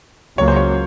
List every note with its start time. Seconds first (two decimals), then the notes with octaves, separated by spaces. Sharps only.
0.38 C#2 C#3 F#3 A#3 C#5
0.48 C5
0.56 C#5